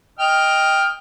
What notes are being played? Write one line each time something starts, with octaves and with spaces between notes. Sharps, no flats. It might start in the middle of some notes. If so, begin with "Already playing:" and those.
D#5 G5 F6